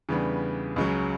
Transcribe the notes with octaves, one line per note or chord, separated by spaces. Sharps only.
E2 C#3 G3 B3 D4
C#2 C#3 F#3